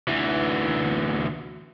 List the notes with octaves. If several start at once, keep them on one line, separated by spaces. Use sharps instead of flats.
D2 E3